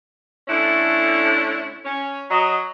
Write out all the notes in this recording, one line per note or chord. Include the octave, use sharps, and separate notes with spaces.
D3 A3 C#4 E4
C#4
F#3 D#5